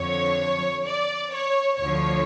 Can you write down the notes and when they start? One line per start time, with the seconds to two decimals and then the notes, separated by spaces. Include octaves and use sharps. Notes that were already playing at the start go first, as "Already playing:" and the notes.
Already playing: F2 D3 F3 C#5
0.85 D5
1.31 C#5
1.77 D2 D3 F3 C#5